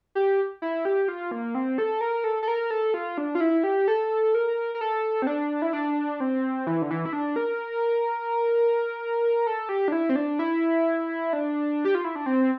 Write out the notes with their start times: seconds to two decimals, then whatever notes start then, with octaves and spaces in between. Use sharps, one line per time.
0.15 G4
0.62 E4
0.85 G4
1.08 F4
1.31 A#3
1.55 C4
1.78 A4
2.01 A#4
2.24 A4
2.43 A4
2.48 A#4
2.71 A4
2.94 F4
3.18 D4
3.35 F4
3.40 E4
3.64 G4
3.88 A4
4.34 A#4
4.75 A#4
4.81 A4
5.22 C4
5.27 D4
5.62 E4
5.73 D4
6.20 C4
6.67 E3
6.82 D3
6.91 E3
7.05 E4
7.13 D4
7.36 A#4
9.47 A4
9.69 G4
9.88 D4
9.92 E4
10.09 C4
10.16 D4
10.39 E4
11.33 D4
11.85 G4
11.95 F4
12.04 E4
12.15 D4
12.26 C4